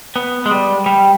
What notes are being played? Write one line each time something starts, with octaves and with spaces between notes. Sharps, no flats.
B3
G#3
G3
G3